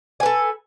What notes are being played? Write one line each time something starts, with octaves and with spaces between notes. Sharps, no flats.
A4 B4 G#5